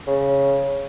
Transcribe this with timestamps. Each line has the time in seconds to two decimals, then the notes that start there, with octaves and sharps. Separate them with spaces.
0.07 C#3